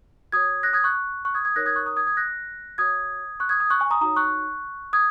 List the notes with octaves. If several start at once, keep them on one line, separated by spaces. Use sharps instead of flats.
F#4 C#5 D#6 G#6
F#6 A#6
D#6 G#6
C#6 F#6
C#6 F#6
D#6 G#6
D#6 G#6
D#4 A#4 C#5 F#6 A#6
D#6 G#6
C#6 F#6
A#5 D#6
D#6 G#6
D#6 G#6
F#6 A#6
F#4 C#5 D#6 G#6
C#6 F#6
D#6 G#6
D#6 G#6
C#6 F#6
G#5 C#6
A#5 D#6
D#4 F#4 C#5 A#5 D#6
C#6 F#6
D#6 G#6